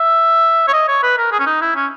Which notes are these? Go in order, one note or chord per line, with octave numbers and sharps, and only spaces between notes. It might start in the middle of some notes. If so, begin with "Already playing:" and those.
Already playing: E5
C#5
D#5
C#5
B4
A#4
G#4
C#4
D#4
E4
C#4